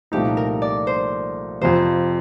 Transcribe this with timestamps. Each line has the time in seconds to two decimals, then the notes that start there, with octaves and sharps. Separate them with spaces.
0.12 C2 A#2 F3 A3 D#4 G4
0.37 A#4
0.62 D5
0.87 C5
1.61 F2 C3 F3 C5